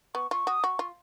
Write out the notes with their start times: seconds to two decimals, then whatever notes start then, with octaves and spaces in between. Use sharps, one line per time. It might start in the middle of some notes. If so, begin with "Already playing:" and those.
0.14 B3 C#6
0.31 F4 C#6
0.47 F#4 D#6
0.64 F#4 C#6
0.79 F4